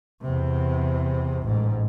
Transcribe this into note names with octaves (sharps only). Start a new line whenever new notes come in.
E2 C3
A1 G#2